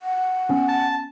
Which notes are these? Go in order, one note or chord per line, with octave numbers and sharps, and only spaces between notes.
F#5
B3 C#4
A5